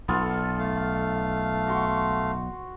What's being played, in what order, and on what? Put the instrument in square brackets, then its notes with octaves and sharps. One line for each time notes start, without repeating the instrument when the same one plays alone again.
[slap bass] B1 [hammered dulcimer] B3 F4 A4
[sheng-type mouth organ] A3 F5
[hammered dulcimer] F#4 C6 C#6